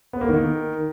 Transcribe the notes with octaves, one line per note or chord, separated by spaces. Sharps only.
B3
A#3
D#3